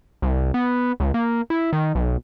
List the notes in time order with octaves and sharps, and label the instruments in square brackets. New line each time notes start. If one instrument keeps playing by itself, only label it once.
[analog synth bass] C2
B3
C#2
A#3
E4
D#3
B1